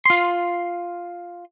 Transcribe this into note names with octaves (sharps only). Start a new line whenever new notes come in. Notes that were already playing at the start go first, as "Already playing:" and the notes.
F4 C6